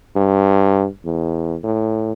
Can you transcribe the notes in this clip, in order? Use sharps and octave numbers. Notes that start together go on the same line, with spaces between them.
G2
E2
A2